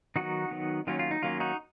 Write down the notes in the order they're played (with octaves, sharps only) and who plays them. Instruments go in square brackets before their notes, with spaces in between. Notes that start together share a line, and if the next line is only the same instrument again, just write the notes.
[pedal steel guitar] D#3 F#3 B3 D#4 F#4
D#3 F#3 B3
D#3 F#3 A#3 C#4 F4
F4
D#4
D#3 F#3 A#3 C#4 F4
D#4 F#4